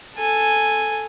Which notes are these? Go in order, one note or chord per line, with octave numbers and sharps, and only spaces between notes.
A4 G#5